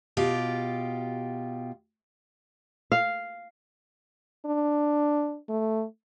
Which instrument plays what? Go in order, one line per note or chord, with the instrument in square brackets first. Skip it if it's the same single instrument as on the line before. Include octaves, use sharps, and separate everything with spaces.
[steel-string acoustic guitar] B2 F4 G4
[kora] F5
[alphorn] D4
A3